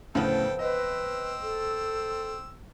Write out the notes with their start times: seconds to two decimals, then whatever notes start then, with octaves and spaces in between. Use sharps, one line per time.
0.15 D2 A2 C#3 F3 B3 A4 G5
0.59 C4 B4 D#5 E6
1.42 A4